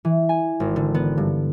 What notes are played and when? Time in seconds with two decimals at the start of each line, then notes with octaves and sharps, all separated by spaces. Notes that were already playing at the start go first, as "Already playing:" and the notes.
0.05 E3
0.29 G#5
0.60 G#1
0.76 D3
0.95 B3
1.18 G2